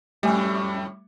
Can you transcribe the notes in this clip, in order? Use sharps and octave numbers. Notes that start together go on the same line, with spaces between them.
F2 A2 G3 A3 G#5